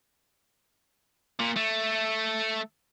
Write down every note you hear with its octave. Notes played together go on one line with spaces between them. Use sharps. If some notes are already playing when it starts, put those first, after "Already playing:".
A#2
A3